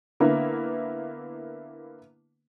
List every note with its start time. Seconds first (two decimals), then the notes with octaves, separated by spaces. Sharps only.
0.20 D3 A#3 B3 E4